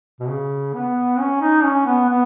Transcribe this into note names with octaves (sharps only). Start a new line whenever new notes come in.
B2
C#3
B3
C#4
D#4
C#4
B3
B3